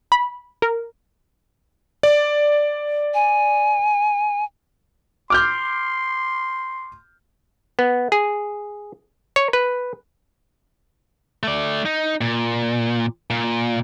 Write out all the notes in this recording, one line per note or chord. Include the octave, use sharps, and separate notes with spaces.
B5
A#4
D5
G#5
C6 D6 F6 G6
B3
G#4
C#5
B4
A3 D5
D#4
A#2
A#2